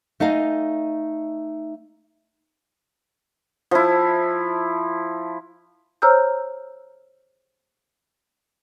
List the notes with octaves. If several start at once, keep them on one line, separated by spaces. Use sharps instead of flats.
A3 D#4 D#5 F5 G#5
F3 E4
C5 C#5 A#5 E6 F6 G6